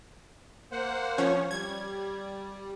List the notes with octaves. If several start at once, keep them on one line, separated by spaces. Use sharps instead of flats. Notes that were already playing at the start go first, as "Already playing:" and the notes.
A#3 C5 F#5
F3 C#4 C#5
G3 G#6